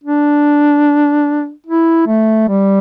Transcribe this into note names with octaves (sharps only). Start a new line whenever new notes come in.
D4
E4
A3
G3